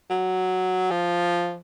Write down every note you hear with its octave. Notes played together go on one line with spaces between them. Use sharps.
F#3
F3